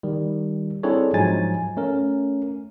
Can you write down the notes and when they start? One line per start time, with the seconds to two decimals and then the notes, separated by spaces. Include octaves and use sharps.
0.03 D#3 G3
0.83 C4 D4 E4 G#4 A4 C#5
1.14 G#2 F3 F#3 D#4 G#5 A6
1.77 A3 C#4 A#4